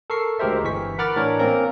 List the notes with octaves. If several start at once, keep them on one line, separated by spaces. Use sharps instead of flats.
A4 A#4 C#6 C7
D2 G#3 G4 A#4 C5 E5
G1 E3 C#6 B6
A#4 F#5 B5 D6 F6 A6
A2 E3 D4 A#4 C#5
A#3 C4 C#4 A#4